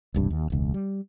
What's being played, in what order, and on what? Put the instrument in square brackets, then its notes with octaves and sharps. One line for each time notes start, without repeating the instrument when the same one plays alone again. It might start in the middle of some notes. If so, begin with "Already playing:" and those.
[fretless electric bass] E1 C2 G2
D#2
E1 C#2
G3